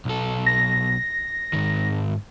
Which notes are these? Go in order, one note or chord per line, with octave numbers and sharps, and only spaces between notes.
B1 A4
A#6
G#2 D#3